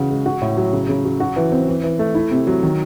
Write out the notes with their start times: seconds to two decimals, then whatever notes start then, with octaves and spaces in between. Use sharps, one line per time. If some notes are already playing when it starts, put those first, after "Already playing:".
Already playing: C#3 E3 F#4
0.10 G#3
0.26 F#4
0.42 A2
0.57 F#3
0.73 C#3
0.89 C#3
1.05 F#3
1.20 F#4
1.36 E3
1.52 C4
1.68 E3
1.84 E3
1.99 A3
2.15 E4
2.31 C3
2.47 F#3
2.63 D#3